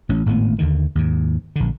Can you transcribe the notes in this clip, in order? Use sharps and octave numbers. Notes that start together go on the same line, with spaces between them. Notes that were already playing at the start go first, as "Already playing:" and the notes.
A1 C#4
G#1 A2 A#3 B3
D#2 D3 D#3
D#2 G#2
A#1 D3